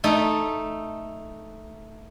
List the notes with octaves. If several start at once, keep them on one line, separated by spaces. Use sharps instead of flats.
A3 D#4 A4